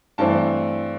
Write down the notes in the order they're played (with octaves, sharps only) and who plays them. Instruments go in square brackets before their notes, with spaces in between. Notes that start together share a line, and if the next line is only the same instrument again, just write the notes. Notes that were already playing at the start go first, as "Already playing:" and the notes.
[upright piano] G2 E3 A3 C4 A5